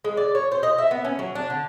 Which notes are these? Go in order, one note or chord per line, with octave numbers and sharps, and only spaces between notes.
G#3
D5
C#5
C5
D#5
E5
B3
C#4
F#3
D4
D3